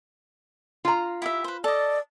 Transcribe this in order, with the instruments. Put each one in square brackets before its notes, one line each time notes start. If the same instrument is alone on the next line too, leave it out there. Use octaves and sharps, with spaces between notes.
[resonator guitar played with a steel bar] F4 A#5
[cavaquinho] E4 G4 E5
B4 C5
[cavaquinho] A4 D#5 [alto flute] D5